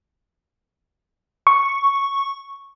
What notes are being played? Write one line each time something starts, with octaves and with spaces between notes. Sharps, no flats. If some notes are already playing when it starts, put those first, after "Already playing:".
C#6